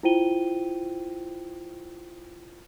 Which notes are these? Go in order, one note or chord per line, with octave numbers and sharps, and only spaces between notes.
E4 F4 C5 G5 D#7 G7